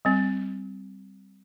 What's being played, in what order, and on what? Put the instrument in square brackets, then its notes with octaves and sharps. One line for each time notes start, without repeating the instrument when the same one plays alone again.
[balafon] G3 C4